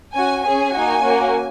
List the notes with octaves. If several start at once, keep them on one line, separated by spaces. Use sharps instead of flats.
C#4 F#4 G#5
C#4 G#4 G#5
A#3 D#4 F#4
A#3 C#4 F#4